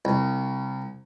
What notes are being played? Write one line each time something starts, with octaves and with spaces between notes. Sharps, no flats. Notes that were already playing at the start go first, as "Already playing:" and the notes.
C2